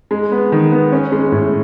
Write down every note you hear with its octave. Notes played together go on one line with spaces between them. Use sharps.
G#3
B3
D#3
B3
C#4
G#3
A2